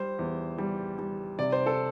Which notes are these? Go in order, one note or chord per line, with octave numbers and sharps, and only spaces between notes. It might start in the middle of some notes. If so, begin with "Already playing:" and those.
Already playing: G3 C5
E2
G3
G3
C3 D5
C5
A4